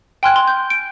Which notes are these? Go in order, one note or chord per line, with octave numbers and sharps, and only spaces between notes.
G5 G#5 C6 F6 F#6 G#6
C6
G6
D7